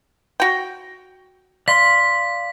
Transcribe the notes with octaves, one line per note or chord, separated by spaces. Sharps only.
F#4 G5
D5 F5 C6 B6